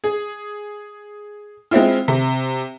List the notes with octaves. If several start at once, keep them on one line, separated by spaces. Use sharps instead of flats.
G#4
G#3 C4 E4 F4
C3